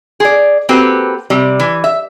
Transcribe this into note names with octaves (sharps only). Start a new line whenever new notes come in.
G#4 D5
A#3 C4 F#4 G4 A4 B4
C3 G3
E3
E5